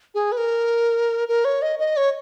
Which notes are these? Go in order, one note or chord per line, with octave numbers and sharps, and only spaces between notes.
G#4
B4
A#4
A#4
C#5
D#5
D#5
C#5